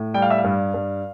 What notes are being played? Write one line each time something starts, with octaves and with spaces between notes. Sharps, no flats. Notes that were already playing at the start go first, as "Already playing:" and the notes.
Already playing: A2
G3 G5
F5
E5
F5
G2
G2